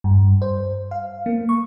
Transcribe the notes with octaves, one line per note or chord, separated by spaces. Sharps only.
G2
C5
F5
A#3
C#6